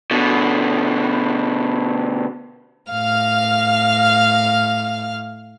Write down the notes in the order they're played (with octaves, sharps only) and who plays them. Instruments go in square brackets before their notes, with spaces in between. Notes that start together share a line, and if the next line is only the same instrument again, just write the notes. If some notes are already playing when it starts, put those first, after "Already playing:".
[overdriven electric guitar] B2 D3
[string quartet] A2 F5 F6